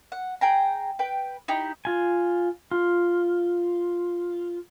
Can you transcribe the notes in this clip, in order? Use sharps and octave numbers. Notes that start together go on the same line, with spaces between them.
F#5
G#4 G5 A#5
B4 G5
D#4 E4 G4
F4 G#5
F4